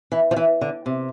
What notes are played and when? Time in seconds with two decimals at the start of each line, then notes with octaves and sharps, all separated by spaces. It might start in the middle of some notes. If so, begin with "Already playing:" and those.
0.12 E3
0.31 F3
0.36 E3
0.61 D3
0.86 C3